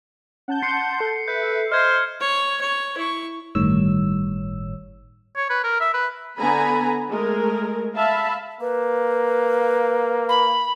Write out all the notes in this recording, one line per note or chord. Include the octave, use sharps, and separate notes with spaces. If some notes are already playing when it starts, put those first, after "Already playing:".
C#4 F#5 A5 G6
C6 C7 C#7
A4
B4 E5 G6
C5 D#5 F6 G#6
C#5
C#5
E4 C#6
G1 A2 D#3 G3 C#5 E6
C#5
B4
A#4
E5
B4
D3 B3 G#5 A#5 B5
G#3 A3 G#4 A#4
E5 F5 A5 B5
A#3 B4
B5